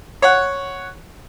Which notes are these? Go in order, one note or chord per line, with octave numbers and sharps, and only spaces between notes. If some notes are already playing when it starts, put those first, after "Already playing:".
C#5 F#5